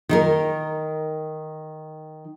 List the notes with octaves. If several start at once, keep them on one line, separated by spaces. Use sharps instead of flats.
D#3 D#4 A#4